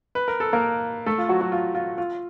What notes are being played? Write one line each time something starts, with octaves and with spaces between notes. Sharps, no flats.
B4
A#4
A4
A#3 A#4
A3 A4
F4
F#3 F#4
F#3 F#4
F4
F4
F4